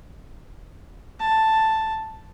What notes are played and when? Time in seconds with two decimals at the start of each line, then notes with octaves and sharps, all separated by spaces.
1.20 A5